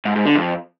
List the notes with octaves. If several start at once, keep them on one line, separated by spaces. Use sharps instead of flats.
G#2
G#2
D3
F2